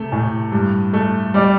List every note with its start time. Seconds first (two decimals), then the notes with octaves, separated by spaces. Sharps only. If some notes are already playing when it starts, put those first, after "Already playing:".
Already playing: C3 A3
0.12 A2
0.52 G2
0.93 A3
1.34 G3 D5